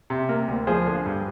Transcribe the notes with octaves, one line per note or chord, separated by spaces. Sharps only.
C3
A#3
D2
F3 G#4 C5
D3
G2